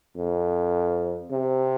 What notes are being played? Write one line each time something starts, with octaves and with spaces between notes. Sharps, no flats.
F2
C3